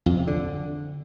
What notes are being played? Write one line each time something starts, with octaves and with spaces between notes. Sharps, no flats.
F2
C3
D3